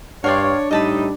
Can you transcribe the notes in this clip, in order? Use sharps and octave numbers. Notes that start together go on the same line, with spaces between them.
G2 D4 C#5 D5 F5 G5 C6
A2 G3 D#4 D#5 A5 B5